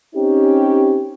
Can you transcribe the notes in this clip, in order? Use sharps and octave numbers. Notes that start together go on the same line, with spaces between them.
C4 C#4 D#4 G4